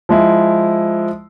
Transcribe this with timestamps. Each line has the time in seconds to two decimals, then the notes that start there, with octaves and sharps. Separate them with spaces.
0.09 F3 G#3 E4